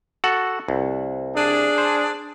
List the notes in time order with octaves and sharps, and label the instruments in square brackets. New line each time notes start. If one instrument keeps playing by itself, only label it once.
[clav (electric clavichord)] F#4 A4 F#5
C2
[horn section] D4 G#4
[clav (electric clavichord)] C5